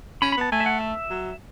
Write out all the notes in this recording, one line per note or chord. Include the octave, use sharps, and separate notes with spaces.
C#4 B5
B5
B3 A5
A3 G#5
E5
F#5
E5
F#3